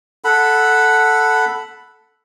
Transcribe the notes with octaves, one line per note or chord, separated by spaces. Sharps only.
A4 F#5 B5